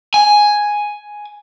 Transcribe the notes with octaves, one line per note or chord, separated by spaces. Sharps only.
G#5